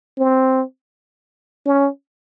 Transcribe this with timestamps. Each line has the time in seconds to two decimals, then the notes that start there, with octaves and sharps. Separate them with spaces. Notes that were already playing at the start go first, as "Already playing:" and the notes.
0.18 C4
1.66 C#4